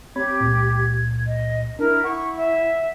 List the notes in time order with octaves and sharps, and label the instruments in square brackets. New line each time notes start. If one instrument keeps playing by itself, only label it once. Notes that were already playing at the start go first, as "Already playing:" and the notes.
[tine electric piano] C4 C#5 B5 [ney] G4 [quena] G#6
[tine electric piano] C#2 A#2
[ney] D#5
[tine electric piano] D4 [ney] E4 [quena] A#4
[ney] E4 [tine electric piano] F#5 [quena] C#6
[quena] E5